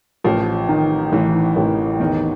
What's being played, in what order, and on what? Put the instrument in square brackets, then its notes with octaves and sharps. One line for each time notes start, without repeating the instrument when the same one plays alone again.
[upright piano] A1 [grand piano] F3
[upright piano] D#3
[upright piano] A1 [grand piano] E3
[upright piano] A1
[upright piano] E2 [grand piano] D#3